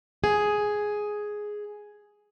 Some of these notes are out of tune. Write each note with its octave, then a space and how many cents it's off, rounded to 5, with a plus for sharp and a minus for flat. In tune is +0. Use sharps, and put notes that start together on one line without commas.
G#4 +5